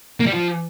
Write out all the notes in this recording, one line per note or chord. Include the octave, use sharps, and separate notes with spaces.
A#3
G3
F3